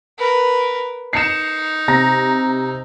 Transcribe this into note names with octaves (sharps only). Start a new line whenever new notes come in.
A#4 B4
D#4 C7 C#7 E7
C3 A#5 A#6